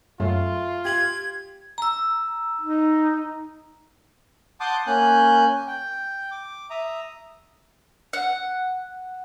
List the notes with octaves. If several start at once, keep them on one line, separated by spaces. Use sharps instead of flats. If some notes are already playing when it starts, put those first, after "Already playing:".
F#2 A3 F4
G4 G#6 F#7
A#5 E6
D#4
F#5 A5 C6 D6 D#6 G6
A#3 C#4 G#5 F#6 G6
G5
D6
E5 A#5 D#6
F#5